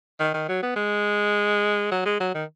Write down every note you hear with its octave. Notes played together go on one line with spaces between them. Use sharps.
D#3
D#3
F#3
B3
G#3
F#3
G#3
F#3
D#3